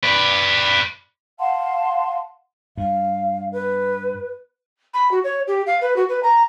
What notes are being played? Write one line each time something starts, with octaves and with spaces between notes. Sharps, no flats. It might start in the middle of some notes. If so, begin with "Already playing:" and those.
B4 D5
F5 F#5 A5 C6
G2 F5
B4
B5
F#4
C#5
G4
F5
B4
F#4
B4
A#5